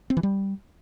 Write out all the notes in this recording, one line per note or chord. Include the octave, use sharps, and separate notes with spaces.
C4
E3
G3